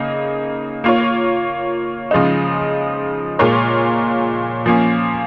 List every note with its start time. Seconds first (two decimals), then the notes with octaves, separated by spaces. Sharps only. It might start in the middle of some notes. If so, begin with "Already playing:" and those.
Already playing: C#3 A#3 D#4
0.84 A#3 F4 C#5
2.11 C#3 F3 G#3 D#4
3.39 A#2 G#3 F4 A#4 C#5
4.66 F3 A#3 C#4